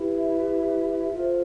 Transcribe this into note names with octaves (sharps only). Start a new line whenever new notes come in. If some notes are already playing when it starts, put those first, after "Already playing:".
Already playing: E4 G4 B4
E5
F4 A4 C5